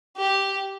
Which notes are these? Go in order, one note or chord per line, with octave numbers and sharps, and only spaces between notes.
G4